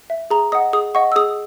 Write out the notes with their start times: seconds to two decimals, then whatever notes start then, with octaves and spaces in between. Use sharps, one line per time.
0.10 E5
0.31 G#4 A#5
0.52 D#5 F#5 D#6
0.73 G#4 D#6
0.95 D#5 F#5 C#6
1.12 E6
1.16 G#4 D#6